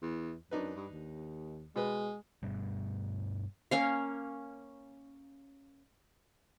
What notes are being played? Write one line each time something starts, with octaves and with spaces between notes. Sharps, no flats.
E2
F#2 D4 D#4 B4
G2
D#2
B2 G#3 B4
G2 B2 G3
A#3 C#4 F5